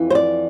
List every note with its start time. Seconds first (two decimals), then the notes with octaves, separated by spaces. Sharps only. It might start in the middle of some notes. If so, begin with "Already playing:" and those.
Already playing: F2 E3
0.10 C5
0.15 D5